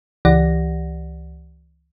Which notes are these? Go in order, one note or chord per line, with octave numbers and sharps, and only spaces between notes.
C#2 E3 G4 D5 F#5 A#6